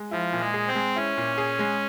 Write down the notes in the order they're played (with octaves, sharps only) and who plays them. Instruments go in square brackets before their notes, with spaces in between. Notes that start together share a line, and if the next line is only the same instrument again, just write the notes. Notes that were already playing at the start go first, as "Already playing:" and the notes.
Already playing: [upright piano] G#3
[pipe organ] F3 [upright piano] E4
[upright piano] A#2
[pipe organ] G#3
[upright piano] G#4
[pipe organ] C4
[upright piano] G#3
[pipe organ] C#4 [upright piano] E4
[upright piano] A#2
G#4
G#3